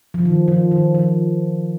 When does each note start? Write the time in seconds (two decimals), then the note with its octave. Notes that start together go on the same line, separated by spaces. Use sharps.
0.14 F3
0.25 D#3
0.48 F3
0.71 D#3
0.95 F3